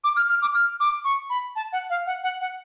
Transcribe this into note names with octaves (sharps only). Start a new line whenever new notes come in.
D6
F6
F6
D6
F6
D6
C#6
B5
A5
F#5
F5
F#5
F#5
F#5